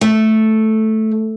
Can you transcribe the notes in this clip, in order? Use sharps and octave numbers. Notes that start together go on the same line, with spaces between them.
A3